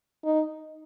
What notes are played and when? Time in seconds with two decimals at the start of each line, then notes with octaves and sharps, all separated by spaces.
0.25 D#4